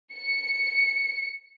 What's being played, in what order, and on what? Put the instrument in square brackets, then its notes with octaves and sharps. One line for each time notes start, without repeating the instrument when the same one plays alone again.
[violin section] C#7